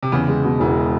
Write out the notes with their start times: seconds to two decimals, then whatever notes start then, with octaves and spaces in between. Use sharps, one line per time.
0.03 C3
0.12 E2 C#3
0.28 G#3
0.45 B2
0.60 E1 E3